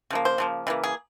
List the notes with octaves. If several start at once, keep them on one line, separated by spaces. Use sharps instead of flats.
C#3 F3 A#3
C5
C#3 F3 A#3
C#3 E3 A#3
G#4